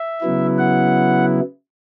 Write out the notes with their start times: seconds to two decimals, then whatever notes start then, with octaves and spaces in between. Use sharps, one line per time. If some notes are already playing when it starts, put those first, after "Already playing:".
Already playing: E5
0.21 C#3 F#3 B3 E4
0.58 F#5